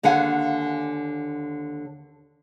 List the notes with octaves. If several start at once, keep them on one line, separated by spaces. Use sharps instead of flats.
D#2 D3 F5 F#5 G#5